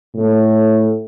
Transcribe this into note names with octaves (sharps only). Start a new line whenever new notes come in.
A2